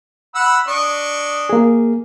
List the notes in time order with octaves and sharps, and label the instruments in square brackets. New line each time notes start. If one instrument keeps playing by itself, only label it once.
[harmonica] F#5 B5 E6
D4 D#5 C#6
[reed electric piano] A#3 G#4